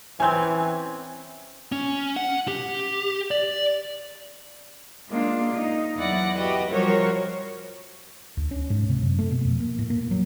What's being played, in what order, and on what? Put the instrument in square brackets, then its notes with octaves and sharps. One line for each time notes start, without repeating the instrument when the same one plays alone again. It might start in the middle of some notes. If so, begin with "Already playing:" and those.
[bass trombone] E3 [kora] C4 C#4 [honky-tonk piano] G#5 G6 G#6
[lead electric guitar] C#4
F#5
G4
D5
[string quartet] G#3 A#3 D4 F4
D#4
E2 F#3 E4 D5 F#5 A#6
F#4 G4 B4 D#5 E5
F3 G3 F#4 A#4 C5 C#5
[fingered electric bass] D2
C#4
G#2
C3
F#2
A3
B2
F2
A#3
A2
A#3
F#3